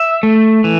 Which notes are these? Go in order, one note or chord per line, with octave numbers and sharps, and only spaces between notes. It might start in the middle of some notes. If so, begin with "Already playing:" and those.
Already playing: E5
A3
E3